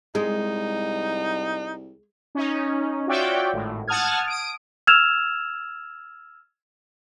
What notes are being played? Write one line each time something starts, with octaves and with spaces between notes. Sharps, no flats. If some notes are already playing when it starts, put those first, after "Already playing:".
C2 G#3 D#4
C#4 D#4
F4 F#4 C#5 D5 E5 G5
G#1 A2
F#5 A5 D#6 F6 G#6
D#6 D7
E6 F6 G#6 E7 F7